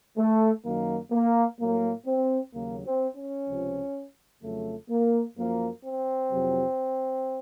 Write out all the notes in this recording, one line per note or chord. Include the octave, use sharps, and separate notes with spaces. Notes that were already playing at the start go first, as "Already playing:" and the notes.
A3
F#2 D#3 F#3 A#3
A#3
A2 F#3 A#3
C4
D#2 C#3 F#3 A#3
C4
C#4
C#2 C3 F3
F2 C#3 F#3 A3
A#3
F#2 F3 A#3
C4
F2 C3 F#3